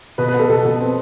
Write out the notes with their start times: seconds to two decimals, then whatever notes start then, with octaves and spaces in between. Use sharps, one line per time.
0.18 B2 B4
0.28 B4
0.34 B3
0.39 A4
0.49 B2 A4
0.65 B2
0.80 C4